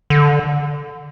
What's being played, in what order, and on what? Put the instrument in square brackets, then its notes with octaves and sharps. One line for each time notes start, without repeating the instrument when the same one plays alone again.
[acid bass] D3